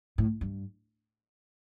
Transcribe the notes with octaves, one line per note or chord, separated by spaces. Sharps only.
A2
G2